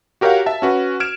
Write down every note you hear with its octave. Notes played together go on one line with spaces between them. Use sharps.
F#4 G4 A#4 C#5 F5 F#5
E5 A5
C#4 F#4 B4
F6 G#6 D7 E7